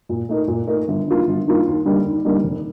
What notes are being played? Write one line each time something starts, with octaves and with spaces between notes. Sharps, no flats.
A#2
A3 D#4 A#4
A#2
A3 D#4 A#4
G1
G2 D#3 A#3 F4
G1
G2 D#3 A#3 F4
D#2
D3 G3 A#3 D#4
D#2
D3 G3 A#3 D#4
F1